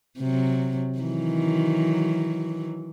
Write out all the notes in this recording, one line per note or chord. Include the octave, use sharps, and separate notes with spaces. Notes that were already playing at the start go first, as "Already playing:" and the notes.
C3 F#3
D#3 E3 F#3